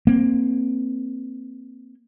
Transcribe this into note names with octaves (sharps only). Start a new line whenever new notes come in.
A#3 C4